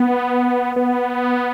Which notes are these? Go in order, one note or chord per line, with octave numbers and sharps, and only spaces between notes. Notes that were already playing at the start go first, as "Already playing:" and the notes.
Already playing: B3
B3